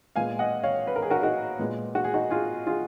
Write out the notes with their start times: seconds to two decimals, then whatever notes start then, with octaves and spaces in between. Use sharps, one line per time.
0.16 A#2 G#3 B3 F5 G#5
0.39 D#5 F#5
0.63 C#5 F5
0.87 B4
0.96 A#4
1.02 G#4
1.10 F#4 A#4
1.23 D#4 F#4
1.59 A#2 G#3 B3
1.95 F#4
2.04 G#4
2.14 D#4 F#4
2.30 F4 G#4
2.67 F4 G#4